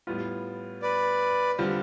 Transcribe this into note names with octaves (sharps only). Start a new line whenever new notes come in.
A2 G3 B3 F4
B4 D5
D3 G3 C4 F4